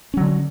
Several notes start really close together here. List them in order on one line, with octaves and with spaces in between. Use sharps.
C#4 F#3 D3